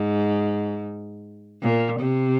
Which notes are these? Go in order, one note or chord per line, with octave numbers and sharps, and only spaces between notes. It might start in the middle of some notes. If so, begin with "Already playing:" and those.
Already playing: G#2
A#2
C3